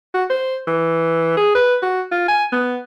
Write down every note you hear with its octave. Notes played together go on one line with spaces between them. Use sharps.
F#4
C5
E3
G#4
B4
F#4
F4
G#5
B3